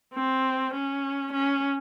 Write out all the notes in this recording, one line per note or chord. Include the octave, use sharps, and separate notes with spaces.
C4
C#4
C#4